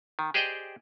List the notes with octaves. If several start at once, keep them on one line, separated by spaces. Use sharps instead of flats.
D#3
G4 G#4 C5 D5 D#5 G5